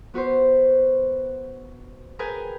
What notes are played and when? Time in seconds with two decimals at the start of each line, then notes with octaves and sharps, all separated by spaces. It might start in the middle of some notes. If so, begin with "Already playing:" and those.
0.14 B3 F#4 B4 C5
2.19 G#4 A#4 B4 G5 G#5